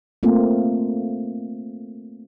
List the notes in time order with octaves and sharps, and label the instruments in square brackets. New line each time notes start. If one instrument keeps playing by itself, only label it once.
[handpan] A3 A#3 C4 F4